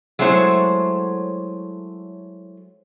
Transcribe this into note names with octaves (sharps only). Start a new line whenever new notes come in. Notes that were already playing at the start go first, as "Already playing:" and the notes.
F#3 G#3 A3 E4 C5 C#5